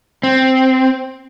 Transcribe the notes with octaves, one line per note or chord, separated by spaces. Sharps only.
C4